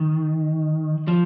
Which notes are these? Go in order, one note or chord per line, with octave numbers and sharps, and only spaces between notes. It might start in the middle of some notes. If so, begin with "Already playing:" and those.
Already playing: D#3
F3